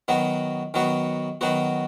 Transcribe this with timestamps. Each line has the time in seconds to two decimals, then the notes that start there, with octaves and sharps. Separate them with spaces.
0.08 D#3 F#3 B3 F#4
0.74 D#3 F#3 B3 F#4
1.41 D#3 F#3 B3 F#4